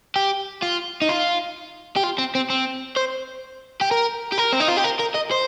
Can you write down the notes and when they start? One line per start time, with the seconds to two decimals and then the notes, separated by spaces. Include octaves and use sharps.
0.16 G4
0.62 F4
1.02 D#4
1.09 F4
1.96 G4
2.04 F4
2.18 C4
2.35 C4
2.50 C4
2.97 C5
3.81 G4
3.91 A#4
4.32 G4
4.38 A#4
4.52 C4
4.60 D#4
4.68 F4
4.77 G4
4.84 A#4
5.00 A#4
5.15 D#5
5.32 C5